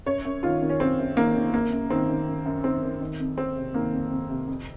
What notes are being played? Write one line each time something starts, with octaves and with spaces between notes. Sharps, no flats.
F#2 C#5
F#2
D#3 F4
D#3
C#4
F#2 C4
F#2
D#3 A#3
D#3
F#2 A#3
F#2
D#3 C4
D#3
F#2
F#2
D#3 C4
D#3
D#3
F2
F2 C4
C3
D#3 A#3
F2
F2
C3
F2